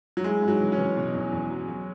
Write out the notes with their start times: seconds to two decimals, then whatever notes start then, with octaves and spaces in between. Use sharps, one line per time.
0.17 F#3
0.24 G#3 E4
0.42 G#2
0.48 F#3
0.61 E3
0.72 C#4
0.78 E3
0.96 B2
1.14 E2
1.32 E2
1.50 F#3
1.68 F#3